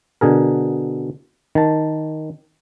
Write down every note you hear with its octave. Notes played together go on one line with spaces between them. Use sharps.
B2 D3 G#4 A#4
D#3 A5